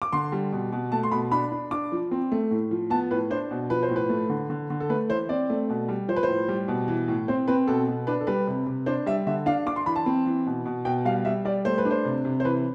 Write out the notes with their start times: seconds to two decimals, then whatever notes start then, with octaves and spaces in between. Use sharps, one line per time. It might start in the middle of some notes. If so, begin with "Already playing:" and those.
0.02 D6
0.13 D3 C6
0.32 G3
0.52 B2
0.72 B2
0.92 A3 A5
1.03 C6
1.11 B2 B5
1.31 D4 B5
1.52 D4
1.71 D4 D6
1.92 F3
2.11 C4
2.32 A3
2.51 A2
2.71 F3
2.90 B3 A5
3.11 A2 B4
3.30 D4 C5
3.51 B2
3.70 F3 B4
3.83 C5
3.90 A2
3.96 B4
4.09 A3
4.30 D3
4.50 D3
4.70 D3
4.80 A4
4.89 A3 B4
5.09 E3 C5
5.29 C4 D5
5.50 A3
5.70 B2
5.89 G3
6.08 F3 C5
6.16 B4
6.23 C5
6.28 A2
6.48 G3
6.68 B2
6.88 E3
7.08 A2
7.28 C4 C5
7.48 C4 B4
7.67 B2 A4
7.87 B2
8.07 D4 B4
8.21 A4
8.27 G3 B4
8.47 C3
8.66 C3
8.86 D4 C5
9.06 G3 E5
9.27 D3 E5
9.46 D4 F5
9.66 D4 D6
9.76 C6
9.86 E3 B5
9.96 A5
10.06 C4
10.26 E3
10.47 B2
10.66 B2
10.85 B2 G5
11.05 G3 F5
11.25 G3 E5
11.45 G3 D5
11.65 A3 C5
11.78 B4
11.85 D4
11.91 C5
12.05 C3
12.25 C3
12.40 C5
12.45 E3 B4